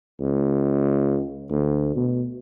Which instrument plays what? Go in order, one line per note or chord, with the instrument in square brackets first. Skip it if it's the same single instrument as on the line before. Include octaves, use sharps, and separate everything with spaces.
[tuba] C#2
D2
B2